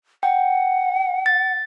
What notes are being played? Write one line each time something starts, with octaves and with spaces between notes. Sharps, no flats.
F#5 G5
A6